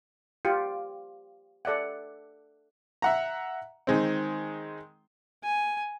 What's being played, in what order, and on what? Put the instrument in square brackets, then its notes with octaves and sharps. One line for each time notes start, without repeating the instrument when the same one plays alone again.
[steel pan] F4 G4
A4 D5 E5 F#5
[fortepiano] E5 F#5 A#5
D#3 G#3 C4
[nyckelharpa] G#5